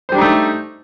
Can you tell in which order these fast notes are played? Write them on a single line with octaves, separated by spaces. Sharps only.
C5 G3 D4 D#4 A3